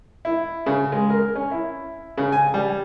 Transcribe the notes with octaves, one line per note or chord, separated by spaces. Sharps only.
E4
C#3
G#3
A#4
C#4
E4
C#3
G#5
G3